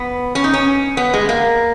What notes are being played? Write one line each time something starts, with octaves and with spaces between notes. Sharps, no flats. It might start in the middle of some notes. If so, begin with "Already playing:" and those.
Already playing: B3
C#4
D#4
C#4
B3
G#3
A#3